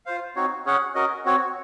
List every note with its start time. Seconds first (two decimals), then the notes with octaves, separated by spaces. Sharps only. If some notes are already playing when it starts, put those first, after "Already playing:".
0.06 F4 C5 F5
0.36 C4 D#4 F#4 C#5
0.66 C#4 G#4 C#5 F#5
0.95 C#4 F#4 A#4 D#5
1.26 C4 F#4 C#5